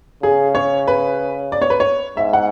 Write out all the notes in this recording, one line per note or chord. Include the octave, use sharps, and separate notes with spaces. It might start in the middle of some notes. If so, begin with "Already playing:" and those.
C#3 G#4
C#5
B4
D5
C#5
B4
C#5
G#2 E5
F#5